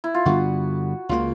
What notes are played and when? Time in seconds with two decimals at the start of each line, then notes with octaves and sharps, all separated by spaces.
0.04 E4
0.15 F4
0.25 G2 D3 G3 B3 F#4
1.09 C#2 C#3 F3 A#3 F4